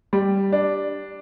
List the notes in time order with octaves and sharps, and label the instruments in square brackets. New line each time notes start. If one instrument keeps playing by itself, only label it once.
[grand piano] G3
D4